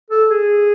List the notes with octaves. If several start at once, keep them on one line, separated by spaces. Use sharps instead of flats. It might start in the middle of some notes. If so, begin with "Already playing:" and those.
A4
G#4